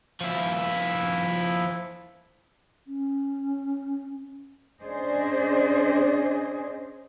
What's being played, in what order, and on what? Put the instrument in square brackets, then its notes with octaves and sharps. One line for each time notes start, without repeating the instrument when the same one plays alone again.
[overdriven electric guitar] F3 E4
[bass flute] C#4
[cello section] C#4 D4 G#4 C5 D5 D#5